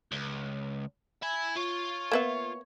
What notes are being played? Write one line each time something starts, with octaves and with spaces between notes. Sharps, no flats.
C#2
E5 G#5 B5
F4 C#5
A#3 B3 E5